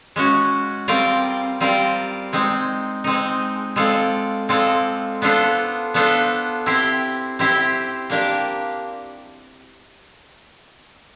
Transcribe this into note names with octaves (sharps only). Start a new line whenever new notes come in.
G#3 C#4 F#4
G3 C4 F4 A#4 D5
G3 C4 F4 A#4 D5
G#3 C4 D#4
G#3 C4 D#4
G#3 C4 F4 A4 D5
G#3 C4 F4 A4 D5
B3 D4 F4 A4 C5
B3 D4 F4 A4 C5
C4 E4 G4 C5
C4 E4 G4 C5
A#3 D4 G4 A#4